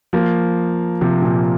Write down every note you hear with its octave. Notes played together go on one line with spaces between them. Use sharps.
F3 A#3
C3 F3
A#2